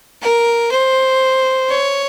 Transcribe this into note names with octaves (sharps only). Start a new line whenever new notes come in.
A#4
C5
C#5